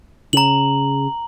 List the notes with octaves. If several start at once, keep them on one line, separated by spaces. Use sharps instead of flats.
C#3 A#5 F#7